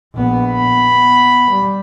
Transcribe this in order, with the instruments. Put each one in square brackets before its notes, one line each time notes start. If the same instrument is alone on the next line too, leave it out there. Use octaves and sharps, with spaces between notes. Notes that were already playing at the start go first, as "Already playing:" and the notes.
[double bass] A#1 B3
[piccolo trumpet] B5
[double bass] B3
G3